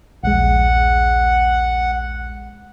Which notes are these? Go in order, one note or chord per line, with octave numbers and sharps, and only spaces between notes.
A#1 D#2 G#3 F#5